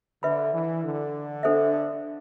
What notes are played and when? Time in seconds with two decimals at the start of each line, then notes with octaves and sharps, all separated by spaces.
0.23 D3 B4 E5 B5
0.54 E3
0.84 D3
1.43 D4 A4 C5 E5